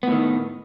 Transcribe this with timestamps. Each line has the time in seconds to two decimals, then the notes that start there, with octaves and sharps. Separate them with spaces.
0.03 B3
0.08 A2
0.12 D#3